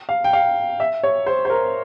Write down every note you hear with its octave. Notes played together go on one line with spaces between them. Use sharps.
F5
G5
F5
E5
C#5
C5
C5
A#4